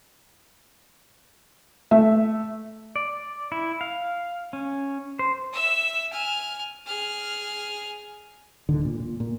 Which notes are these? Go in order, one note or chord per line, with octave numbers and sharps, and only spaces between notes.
A3 E5
D5
E4
F5
C#4
C5
E5 E6
G#5 F6
G#4 F6
D1 D3 D#3
A#2
A#2
A#2